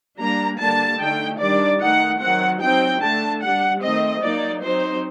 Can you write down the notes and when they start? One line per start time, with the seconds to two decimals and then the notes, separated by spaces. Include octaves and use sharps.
0.19 G3 A#3 D4 A#5
0.59 D3 G3 A#3 D4 A5
0.99 D3 A3 D#4 G5
1.40 D#3 G3 D4 D5
1.80 D#3 A3 D#4 F#5
2.21 D#3 F#3 C4 F#5
2.61 F#3 C4 D#4 G5
3.02 D3 A3 D4 A5
3.42 G3 D4 F#5
3.82 D#3 A3 C4 D#5
4.23 F#3 A#3 D#4 D5
4.63 F#3 C4 D#4 C5